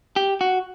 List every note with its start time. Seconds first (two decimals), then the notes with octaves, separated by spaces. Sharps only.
0.16 G4
0.41 F#4